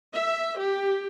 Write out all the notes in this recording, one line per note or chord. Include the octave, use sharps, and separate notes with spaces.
E5
G4